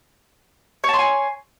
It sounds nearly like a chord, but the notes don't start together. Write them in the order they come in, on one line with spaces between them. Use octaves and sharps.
C#5 A5 C6 G#5